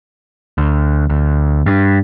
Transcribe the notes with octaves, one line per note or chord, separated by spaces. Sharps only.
D2
D2
G2